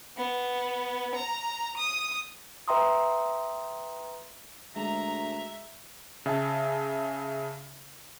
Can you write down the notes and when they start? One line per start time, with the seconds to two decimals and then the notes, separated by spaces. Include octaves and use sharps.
0.17 B3
1.15 A#5
1.77 D#6
2.68 B4 E5 G5 A#5 C6 D#6
4.76 D2 G#3 E5 A#5
6.26 C#3 E5 G#5 A5